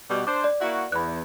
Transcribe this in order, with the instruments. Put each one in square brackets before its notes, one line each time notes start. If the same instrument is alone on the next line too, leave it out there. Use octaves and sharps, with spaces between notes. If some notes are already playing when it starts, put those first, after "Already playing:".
[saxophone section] B2 G3
[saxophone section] D4 C5 [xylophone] D6
[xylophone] D5
[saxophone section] A#3 E4 F#4
[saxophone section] E2 [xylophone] B5 F#6